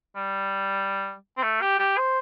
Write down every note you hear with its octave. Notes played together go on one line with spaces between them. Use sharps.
G3
C4
A3
G4
G4
C5